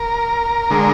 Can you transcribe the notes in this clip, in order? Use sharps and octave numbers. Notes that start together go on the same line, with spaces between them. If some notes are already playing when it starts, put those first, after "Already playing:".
Already playing: A#4
D3 G#3